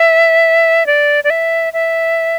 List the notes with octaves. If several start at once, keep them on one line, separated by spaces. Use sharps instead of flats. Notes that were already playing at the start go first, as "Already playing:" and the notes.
Already playing: E5
D5
D5
E5
E5